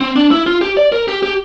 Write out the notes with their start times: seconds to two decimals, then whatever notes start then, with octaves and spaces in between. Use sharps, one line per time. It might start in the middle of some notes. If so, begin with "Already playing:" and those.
0.01 C4
0.16 D4
0.31 E4
0.46 F4
0.61 G4
0.77 D5
0.92 A#4
1.08 G4
1.23 G4